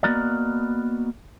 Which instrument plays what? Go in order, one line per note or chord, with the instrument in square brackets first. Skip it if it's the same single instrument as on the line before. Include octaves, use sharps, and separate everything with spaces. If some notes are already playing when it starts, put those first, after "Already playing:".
[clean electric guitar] A#3 B3 F#4 A#4 D5 D#5